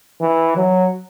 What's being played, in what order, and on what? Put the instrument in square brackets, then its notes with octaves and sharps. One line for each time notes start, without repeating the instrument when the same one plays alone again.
[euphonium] E3
F#3